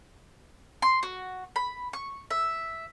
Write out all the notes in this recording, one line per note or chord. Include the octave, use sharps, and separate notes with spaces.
C6
F#4
B5
C#6
E5